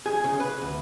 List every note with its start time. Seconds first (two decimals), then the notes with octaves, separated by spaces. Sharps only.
0.06 G#4
0.24 C#3
0.40 B4
0.62 D2